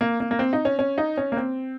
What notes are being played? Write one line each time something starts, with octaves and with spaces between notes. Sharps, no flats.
A#3
A#3
A#3
C4
D#4
C#4
C#4
D#4
C#4
A#3
C4